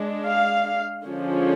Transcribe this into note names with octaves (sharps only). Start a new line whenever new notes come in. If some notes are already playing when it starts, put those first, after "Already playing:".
Already playing: G#3 D4
F5
D3 F3 G#3 C#4